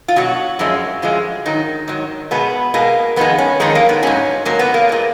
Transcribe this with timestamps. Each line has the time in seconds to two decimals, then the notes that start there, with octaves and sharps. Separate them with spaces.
0.08 F4
0.16 B2 F#3 F#4
0.59 F#2 F3 G#3
1.02 F#2 F3 G#3
1.45 G#2 D#3 F#3 D#4
1.88 G#2 D#3 F#3
2.31 B2 G#3 B3
2.74 B2 G#3 A#3
3.16 F2 D#3 G#3 B3
3.38 C#4
3.60 F2 D#3 G#3 D#4
3.75 A#3
3.89 B3
4.03 G#2 F#3 C#4
4.45 G#2 F#3 A#3
4.59 B3
4.74 A#3
4.89 A#2 G#3